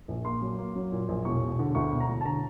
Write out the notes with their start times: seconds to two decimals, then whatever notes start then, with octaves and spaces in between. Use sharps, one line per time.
0.08 A#1
0.25 A#3 C6
0.42 F#3
0.58 A#3
0.76 F#3
0.92 A#2
1.08 A#1
1.25 E1 C#6
1.42 E1
1.59 D3
1.75 D2 C#6
1.92 E1
2.00 A#5
2.08 E1
2.21 A5
2.25 D3 A#5